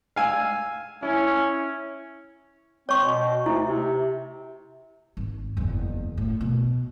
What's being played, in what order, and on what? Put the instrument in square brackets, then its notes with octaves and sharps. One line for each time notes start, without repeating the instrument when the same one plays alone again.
[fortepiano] F5 G#5 E6
[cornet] C#4 [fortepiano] E4
[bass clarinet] C4 [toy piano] C#5 C#6
[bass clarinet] B2
[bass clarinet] D2 [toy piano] E4
[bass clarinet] C3
[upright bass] G#1
F#1 E2
A2
B2